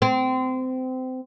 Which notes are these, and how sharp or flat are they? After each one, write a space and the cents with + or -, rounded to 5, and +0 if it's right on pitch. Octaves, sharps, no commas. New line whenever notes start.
C4 -25